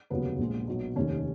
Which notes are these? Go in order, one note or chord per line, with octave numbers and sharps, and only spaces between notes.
F1 D#2 C#3 F#3 B3 B4
A#1 A#2 G#3
B1 A#2 F#3
F1 D#2 D#3 C#4